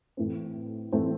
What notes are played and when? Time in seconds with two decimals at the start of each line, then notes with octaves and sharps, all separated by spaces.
0.17 A2 E3 A3 C4
0.92 A2 E3 A3 C4